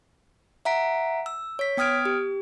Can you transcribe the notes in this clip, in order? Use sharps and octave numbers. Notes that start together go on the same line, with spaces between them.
E5 F#5 A#5 B6 D7
E6
C#5 B6
B3 G5 D#6 F6 G#6 D7
G4